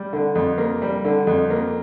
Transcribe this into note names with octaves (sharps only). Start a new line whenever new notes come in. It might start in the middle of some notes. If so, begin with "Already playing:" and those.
Already playing: G3
D3
F2
A#3
G3
D3
F2
A#3